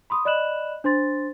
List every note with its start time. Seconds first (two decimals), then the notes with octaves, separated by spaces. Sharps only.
0.10 B5 C6 D#6
0.25 D5 D#5 B5 F#6 E7 F#7
0.84 D4 C5 C6 A6